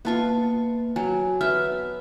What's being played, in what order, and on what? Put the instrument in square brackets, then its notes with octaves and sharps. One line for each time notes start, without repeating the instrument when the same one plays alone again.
[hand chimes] A#3 A5 [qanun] B3 F4 C#6
[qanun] F#3 [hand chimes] G#5
[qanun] B3 E5 [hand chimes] F6